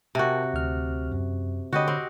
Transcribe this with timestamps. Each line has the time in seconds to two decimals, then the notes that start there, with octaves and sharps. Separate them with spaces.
0.15 C3 F#4 A#4 G5 A5
0.54 D2 F6
1.12 F#2
1.73 D3 F#4 G4 C#5 D#5 B5
1.88 C4